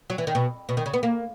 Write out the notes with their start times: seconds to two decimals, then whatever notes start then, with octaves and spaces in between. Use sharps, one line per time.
0.10 F#3
0.18 E3
0.27 D#3
0.35 B2
0.69 B2
0.77 D#3
0.86 C#3
0.94 B3
1.03 A#3